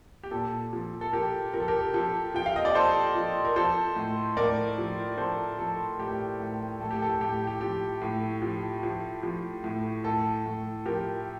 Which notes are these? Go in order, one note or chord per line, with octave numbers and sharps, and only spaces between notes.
G4
A#2 A4
F3
A4
F3 G4 A#4
F3 A#4
A4
G4 A#4
F3 A4
F3 G5
F5
D#5
D5
F3 A4 C5
F3
A#4
F3 A4 C5
A2
A2 A#4 D5
F3
F3 A4 C5
F3 A4
A2 G4
A2
A2 A4
G4
A4
A2 G4
G4
F3 G4
A2
F3
F3
F3
A2
A2 A4
A2
F3 G4 A#4